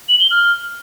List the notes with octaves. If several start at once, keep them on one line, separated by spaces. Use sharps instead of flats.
F#7
G7
F6